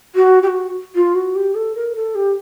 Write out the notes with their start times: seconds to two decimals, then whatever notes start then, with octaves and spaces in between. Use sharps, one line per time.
0.15 F#4
0.42 G4
0.47 F#4
0.95 F4
1.14 F#4
1.35 G4
1.55 A4
1.75 A#4
1.95 A4
2.15 G4